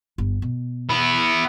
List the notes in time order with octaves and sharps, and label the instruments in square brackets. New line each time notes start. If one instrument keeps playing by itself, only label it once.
[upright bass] G1
B2
[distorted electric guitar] B3 E4